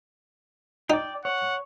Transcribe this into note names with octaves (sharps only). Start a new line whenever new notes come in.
D#4 D5 G5
C#5 F#5